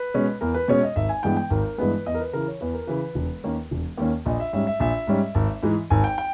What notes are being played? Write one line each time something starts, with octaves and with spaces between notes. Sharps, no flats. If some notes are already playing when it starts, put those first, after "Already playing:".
Already playing: B4
B2 G#3 C#4
E2 A#4
B4
B2 G#3 C#4 C#5
D#5
G#1 E5
G#5
G2 E3 G#3 B3 G5
G5
G#1 A#4
G2 E3 G#3 B3 B4
E2 D#5
A#4
B4
C#3 E3 A#4
C#5
E2 B4
A#4
C#3 E3 B4
E1
D#2 D#3 A#3 C#4
E1
D#2 D#3 A#3 C#4
A#1 D#5
E5
G#2 G3 C#4 E5
E5
A#1 E5
G#2 G3 C#4
G#1
G#2 E3 G#3
G#1 G#5
G5
G5